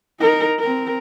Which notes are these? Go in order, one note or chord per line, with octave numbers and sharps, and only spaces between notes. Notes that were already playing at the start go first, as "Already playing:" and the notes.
D#4 A#4
C4 A#4